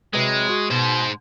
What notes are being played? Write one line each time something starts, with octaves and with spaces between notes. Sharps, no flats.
C3 F#3 G#3 B4
F#4
G#2 B2 C5